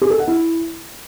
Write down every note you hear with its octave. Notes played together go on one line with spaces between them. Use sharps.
G#4
A4
F#5
E4